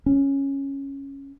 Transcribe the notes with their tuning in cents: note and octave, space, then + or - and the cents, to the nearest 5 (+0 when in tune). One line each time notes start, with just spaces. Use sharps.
C#4 -5